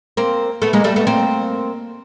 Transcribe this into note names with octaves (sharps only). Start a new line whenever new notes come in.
A#3 C4
A3 B3
G#3 A#3
G3 A3
A3 B3
A#3 C4